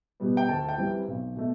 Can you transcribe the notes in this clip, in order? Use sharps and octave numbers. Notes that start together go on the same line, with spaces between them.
B2 G3 B3
G5
D2 A5
G5
C3 E3 G3 C4
B1
B2 A3